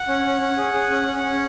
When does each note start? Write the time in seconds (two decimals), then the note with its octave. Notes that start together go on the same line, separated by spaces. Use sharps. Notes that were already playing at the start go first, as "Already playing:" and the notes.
Already playing: F#5
0.08 C#4
0.25 C#4
0.41 C#4
0.57 G#4
0.74 G#4
0.90 C#4
1.07 C#4
1.23 C#4